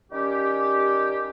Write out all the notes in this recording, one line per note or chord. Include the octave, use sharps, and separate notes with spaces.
D#3 G3 C#4 G4